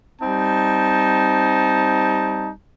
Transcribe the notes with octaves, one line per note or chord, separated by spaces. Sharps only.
G3 C4 D#4 A5